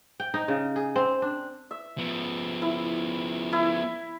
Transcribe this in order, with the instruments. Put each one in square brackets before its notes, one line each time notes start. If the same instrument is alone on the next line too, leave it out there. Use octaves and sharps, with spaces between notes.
[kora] G5
D#4
C#3
G#4
C4
D4
[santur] E5
[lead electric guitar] F3 B3
[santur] E4
E4